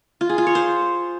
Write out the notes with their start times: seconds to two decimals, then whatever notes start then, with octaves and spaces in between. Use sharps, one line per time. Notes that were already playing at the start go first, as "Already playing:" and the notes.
0.21 F4
0.29 G#4
0.38 F4
0.47 C#5
0.55 C5